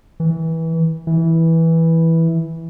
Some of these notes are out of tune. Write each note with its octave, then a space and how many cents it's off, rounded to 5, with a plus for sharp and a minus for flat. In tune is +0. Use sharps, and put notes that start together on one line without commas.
E3 -20
E3 -10